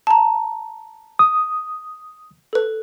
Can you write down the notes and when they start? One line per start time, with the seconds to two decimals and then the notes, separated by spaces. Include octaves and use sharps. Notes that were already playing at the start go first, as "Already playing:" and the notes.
0.07 A5 A#5
1.19 D#6
2.53 A4 B4